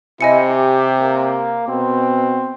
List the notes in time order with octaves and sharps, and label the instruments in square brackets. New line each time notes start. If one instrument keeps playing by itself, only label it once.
[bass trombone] C3 [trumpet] E4 [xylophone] D#5 G#5 C#7
[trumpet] G4
A#3
[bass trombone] B2 [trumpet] C4